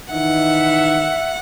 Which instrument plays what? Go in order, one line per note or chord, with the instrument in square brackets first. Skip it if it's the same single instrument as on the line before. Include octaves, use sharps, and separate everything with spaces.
[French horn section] D#3 E3 D#4 [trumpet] E5 [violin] F#5